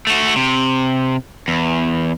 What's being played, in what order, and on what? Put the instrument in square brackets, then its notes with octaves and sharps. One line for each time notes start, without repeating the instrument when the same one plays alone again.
[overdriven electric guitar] A3 F#4
C3
E2